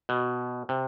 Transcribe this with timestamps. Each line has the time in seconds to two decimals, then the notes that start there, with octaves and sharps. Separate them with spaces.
0.09 B2
0.69 C3